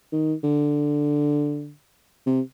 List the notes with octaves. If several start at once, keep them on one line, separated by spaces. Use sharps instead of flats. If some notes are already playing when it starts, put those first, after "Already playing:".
D#3
D3
C3